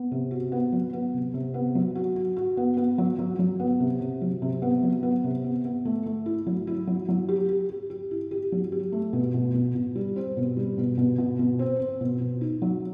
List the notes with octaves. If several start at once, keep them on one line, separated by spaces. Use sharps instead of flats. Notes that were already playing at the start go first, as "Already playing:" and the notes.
Already playing: B3
C3
F#4
B3
F#3
B3
C3
C3
B3
F#3
F#4
F#4
F#4
B3
B3
F#3
F#3
F#3
B3
C3
C3
F#3
C3
B3
F#3
B3
C3
B3
B3
A3
A3
E4
F#3
E4
F#3
F#3
G4
G4
G4
G4
E4
G4
F#3
G4
A3
B2
B2
B2
B2
G3
C4
B2
G3
B2
B2
B2
B2
C4
C4
B2
B2
D#4
F#3